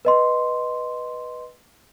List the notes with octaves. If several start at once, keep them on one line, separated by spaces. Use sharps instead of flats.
B4 D#5 C6